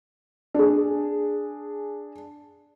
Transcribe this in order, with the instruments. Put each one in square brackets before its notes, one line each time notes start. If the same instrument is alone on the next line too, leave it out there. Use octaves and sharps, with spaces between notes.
[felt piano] D4 G#4